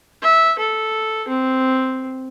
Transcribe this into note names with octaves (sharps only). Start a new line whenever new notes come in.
E5
A4
C4